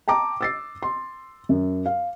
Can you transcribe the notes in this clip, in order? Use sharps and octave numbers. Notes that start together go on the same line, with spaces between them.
G5 A5 A#5 D6
E6 A6 C7
C6
F#2
F5